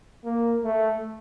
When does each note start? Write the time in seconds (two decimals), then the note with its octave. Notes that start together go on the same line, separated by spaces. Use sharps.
0.25 A#3
0.64 A3